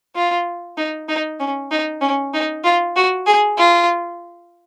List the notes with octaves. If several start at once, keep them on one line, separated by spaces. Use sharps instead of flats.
F4
D#4
D#4
C#4
D#4
C#4
D#4
F4
F#4
G#4
F4